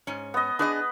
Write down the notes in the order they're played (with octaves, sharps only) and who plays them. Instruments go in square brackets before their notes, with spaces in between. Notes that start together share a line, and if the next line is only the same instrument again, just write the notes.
[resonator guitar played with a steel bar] G#2 C#4
[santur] B3 D#5
[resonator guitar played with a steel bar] D4 G#4 D#5 [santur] B4